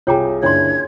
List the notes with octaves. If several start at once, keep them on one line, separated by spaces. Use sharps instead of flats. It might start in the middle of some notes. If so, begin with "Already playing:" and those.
C2 F4 G#4 C#5 G5 A#5 D6
F#1 D4 E4 C#5 G#5 C6 G#6